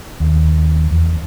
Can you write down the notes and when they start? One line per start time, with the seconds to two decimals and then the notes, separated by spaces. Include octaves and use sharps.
0.20 D#2
0.91 E2